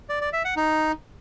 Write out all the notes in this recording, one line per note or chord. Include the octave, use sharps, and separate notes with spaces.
D5
D5
E5
F#5
D#4